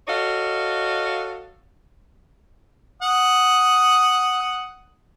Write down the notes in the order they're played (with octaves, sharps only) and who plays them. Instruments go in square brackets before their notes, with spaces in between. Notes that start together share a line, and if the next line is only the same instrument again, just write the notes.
[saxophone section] F#4 A4 C#5 D#5 F5
[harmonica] F#5 D#6